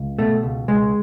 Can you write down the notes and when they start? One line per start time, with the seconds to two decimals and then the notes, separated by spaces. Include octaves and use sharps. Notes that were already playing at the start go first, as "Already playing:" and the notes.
Already playing: C#2
0.18 B2 A3
0.43 C#2
0.68 C#2 G#3